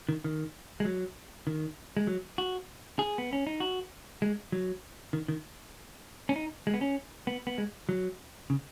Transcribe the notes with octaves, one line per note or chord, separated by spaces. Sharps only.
D#3
D#3
G#3
F#3
D#3
G#3
F#3
F#4
G#4
B3
C#4
D#4
F#4
G#3
F#3
D#3
D#3
C#4
D#4
G#3
B3
C#4
B3
B3
G#3
F#3
C#3